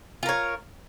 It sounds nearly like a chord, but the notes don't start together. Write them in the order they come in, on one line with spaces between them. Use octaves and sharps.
F4 A#4 C#5